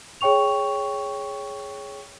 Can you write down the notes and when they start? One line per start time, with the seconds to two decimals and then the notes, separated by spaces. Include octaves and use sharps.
0.21 G#4 C#5 G5 C#6 F7